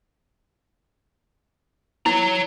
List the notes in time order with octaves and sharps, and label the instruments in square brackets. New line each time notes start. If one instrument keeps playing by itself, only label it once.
[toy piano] E4 [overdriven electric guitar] C#5 A#5